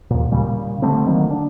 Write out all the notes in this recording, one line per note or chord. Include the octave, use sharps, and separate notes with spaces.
D#2 A#2
A#2 C#3 G3
D3 G3 A3 C4
D3 D#3 F#3 A#3
D4